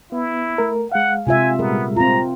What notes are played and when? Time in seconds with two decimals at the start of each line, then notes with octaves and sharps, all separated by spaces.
0.12 B3 E4
0.58 A3 A#4
0.92 G#3 F5 F#5
1.27 C3 F4 E5 G#5
1.59 A#2 G3 G#3 B3 A#4
1.96 C4 F4 A#5